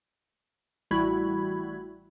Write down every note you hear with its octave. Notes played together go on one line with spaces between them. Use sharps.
A1 G3 E4 F#4 B5 G#6